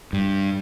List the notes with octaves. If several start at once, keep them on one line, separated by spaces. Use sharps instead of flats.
G2